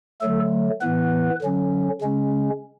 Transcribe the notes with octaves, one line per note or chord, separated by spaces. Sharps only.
D3 F#3 A3 A4
A2 E3 B3 B4
D3 F#3 C#4
C#3 G#3 C#4